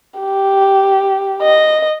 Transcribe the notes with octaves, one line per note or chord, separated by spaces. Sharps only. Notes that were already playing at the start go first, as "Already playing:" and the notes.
G4
D#5